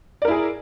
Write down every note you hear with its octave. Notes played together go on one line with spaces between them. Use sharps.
E4 G#4 A#4 D5